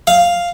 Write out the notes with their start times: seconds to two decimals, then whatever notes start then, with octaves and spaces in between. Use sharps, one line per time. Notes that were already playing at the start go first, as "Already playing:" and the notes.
0.07 F5